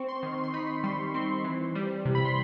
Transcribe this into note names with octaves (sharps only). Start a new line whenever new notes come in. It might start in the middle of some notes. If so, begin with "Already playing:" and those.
Already playing: C4 C#6
C6
D#3
C6
D#4 B5
G3 C6
C4 C6
E3
G3
C3
B5
C6